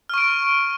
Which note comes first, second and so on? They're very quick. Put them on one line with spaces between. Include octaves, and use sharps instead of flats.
F6 C#6 D7